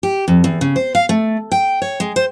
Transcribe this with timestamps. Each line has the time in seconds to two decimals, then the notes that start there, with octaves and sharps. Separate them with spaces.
0.03 G4
0.28 F2
0.44 E2
0.61 C#3
0.76 C5
0.95 F5
1.09 A3
1.52 G5
1.82 C#5
2.00 G#3
2.16 C5